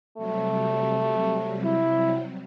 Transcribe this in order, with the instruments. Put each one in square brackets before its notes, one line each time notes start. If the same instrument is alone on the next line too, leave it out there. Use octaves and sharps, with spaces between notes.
[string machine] C3 F#3 G3 [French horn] A3
[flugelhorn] E4